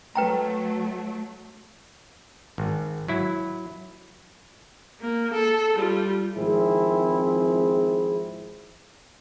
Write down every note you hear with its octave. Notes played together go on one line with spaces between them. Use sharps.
F#3 A3 B4 G5 A#5
G#1
F#3 E4
A#3
A4
G3 F4
G#1 F3 C4 E4 G#4